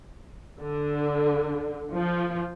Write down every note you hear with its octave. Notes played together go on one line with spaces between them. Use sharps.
D3
F3